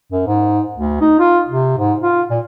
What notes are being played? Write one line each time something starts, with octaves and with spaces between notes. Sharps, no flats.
F#2
G#2
D2
D#4
F4
C3
G#2
F4
A#2